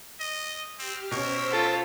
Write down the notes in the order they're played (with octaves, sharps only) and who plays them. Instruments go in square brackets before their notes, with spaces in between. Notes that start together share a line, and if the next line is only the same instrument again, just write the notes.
[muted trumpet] D#5
[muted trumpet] C4 [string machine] G4 F6
[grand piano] B2 C#4 [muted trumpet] A#4 [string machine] C5 E6 B6
[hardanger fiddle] F4 A4